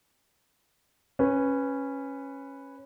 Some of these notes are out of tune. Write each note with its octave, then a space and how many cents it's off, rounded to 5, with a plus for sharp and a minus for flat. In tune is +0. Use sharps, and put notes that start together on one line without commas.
C#4 -10 B4 +0